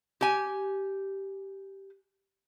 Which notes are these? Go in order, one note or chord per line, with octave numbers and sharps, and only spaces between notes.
G4 G#5